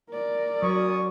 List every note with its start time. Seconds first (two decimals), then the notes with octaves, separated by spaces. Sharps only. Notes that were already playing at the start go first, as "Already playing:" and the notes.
0.10 A#4 D5
0.63 F#3 C#4 C#5 C#6 D#6